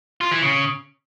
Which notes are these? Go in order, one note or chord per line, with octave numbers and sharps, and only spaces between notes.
F4
E3
C#3